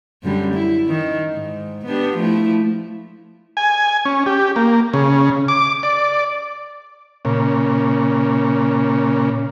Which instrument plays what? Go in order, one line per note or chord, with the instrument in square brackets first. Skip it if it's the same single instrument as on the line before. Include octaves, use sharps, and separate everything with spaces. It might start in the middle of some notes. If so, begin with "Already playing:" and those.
[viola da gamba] F#2 D3 G3
E4
D#3
G#2
B3 D4 G4
F3 A3 E4
[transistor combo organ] G#5
C#4
G4
A#3
C#3
D6
D5
A#2 C#3